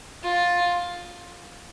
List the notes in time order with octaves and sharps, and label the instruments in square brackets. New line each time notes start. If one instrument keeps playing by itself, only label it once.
[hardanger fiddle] F4